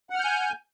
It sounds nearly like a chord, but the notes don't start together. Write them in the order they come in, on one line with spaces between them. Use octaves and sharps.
F#5 F6 G6 G#5